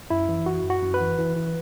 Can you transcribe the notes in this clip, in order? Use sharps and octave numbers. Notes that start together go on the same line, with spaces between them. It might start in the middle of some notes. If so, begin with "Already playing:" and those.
F#2 E4
E3
F#2 F#4
F#2
F#4
F#2
B4
E3
E3
E3